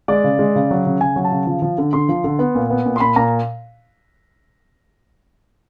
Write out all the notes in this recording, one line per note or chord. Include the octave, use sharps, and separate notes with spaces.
G#3 D5
C#3
G#3
C#3
F#3
C#3
C#3 G#5
F#3
A5
C#3
F3
F3
D3
D3 C6
F3
D3
B3
A#2
B3
A#2
C6
A#2 B5
A#2 A#5